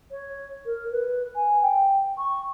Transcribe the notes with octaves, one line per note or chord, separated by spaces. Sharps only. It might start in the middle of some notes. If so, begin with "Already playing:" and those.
C#5
A#4
B4
G#5
G5
C#6